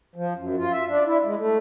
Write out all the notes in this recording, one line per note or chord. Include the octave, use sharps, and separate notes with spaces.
F3
F#2
F4
E5
D4
E4
G#3
A3